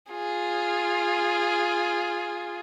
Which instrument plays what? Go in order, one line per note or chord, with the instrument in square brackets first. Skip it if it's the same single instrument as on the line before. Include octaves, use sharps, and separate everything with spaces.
[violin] F4 G#4